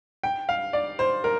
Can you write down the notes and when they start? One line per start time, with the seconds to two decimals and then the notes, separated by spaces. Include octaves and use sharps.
0.23 G5
0.49 F5
0.73 D5
0.99 C5
1.24 A#4